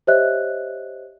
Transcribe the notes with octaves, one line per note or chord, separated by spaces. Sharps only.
G4 C5 C#5 D#5 E5 F#6